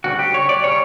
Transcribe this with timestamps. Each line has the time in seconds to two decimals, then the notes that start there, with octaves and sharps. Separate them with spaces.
0.04 D2 C#3 G3 F#4
0.19 G4
0.34 C#5
0.49 D5
0.64 C#3 G3 C#5